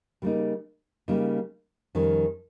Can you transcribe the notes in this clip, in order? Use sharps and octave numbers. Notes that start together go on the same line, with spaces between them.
C#3 G3 A#3 D#4
C#3 G3 A#3 D#4
F2 D#3 G3 C#4